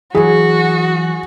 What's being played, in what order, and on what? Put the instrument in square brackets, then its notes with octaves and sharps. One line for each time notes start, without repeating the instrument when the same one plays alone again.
[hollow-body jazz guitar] E3 F#3 [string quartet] F#4 [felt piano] G#4